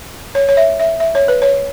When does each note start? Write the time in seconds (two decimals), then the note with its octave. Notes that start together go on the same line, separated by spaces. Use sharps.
0.35 C#5
0.49 C#5
0.57 E5
0.79 E5
1.00 E5
1.15 C#5
1.28 B4
1.42 C#5